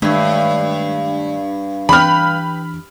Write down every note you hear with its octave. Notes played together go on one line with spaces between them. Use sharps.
G2 D#3 G#3 A3 C#5 E5
E3 D4 B4 G5 B5 F6